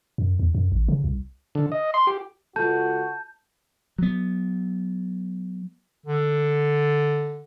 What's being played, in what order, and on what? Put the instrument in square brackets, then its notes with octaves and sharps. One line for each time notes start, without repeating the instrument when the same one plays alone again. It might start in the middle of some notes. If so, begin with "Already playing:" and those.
[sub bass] F#2
E2
F#2
A1
C#3
C2
[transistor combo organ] D3
D#5
C6
G4
[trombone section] C#2 F#4 [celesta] F4 A4 [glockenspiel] A5 G6
[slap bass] F#3 B3
[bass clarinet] D3